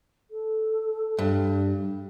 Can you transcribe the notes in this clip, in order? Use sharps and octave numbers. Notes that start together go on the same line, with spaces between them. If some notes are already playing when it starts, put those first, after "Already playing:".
A4
G2